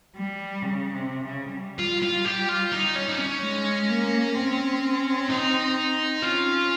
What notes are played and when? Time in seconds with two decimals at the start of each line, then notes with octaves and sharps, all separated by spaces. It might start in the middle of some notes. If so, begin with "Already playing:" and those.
0.16 G3
0.62 C#3
0.93 C3
1.25 C#3
1.56 G3
1.79 F4
2.02 F4
2.25 G4
2.49 F4
2.72 D#4
2.96 C#4
3.08 D#4
3.19 C#4
3.43 G#3
3.89 A#3
4.35 C4
5.29 D#4
6.22 C#4 F4